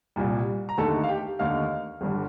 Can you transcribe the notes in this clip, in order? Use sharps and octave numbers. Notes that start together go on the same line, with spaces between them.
C2 A#2 G3
A#5
D#2 D3 A3 D#4 A4 A5
F5
G4 G5
D#2 D3 A3 D#4 F5 F6
G1 G2 D3 G3